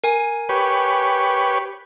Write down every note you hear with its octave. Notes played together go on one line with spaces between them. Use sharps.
A#4 G#5
G4 B4 C#5